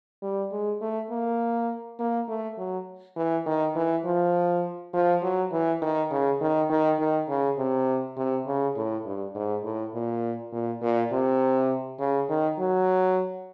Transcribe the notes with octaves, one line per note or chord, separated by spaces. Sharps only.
G3
G#3
A3
A#3
A#3
A3
F#3
E3
D#3
E3
F3
F3
F#3
E3
D#3
C#3
D#3
D#3
D#3
C#3
C3
C3
C#3
A2
G2
G#2
A2
A#2
A#2
A#2
C3
C#3
D#3
F#3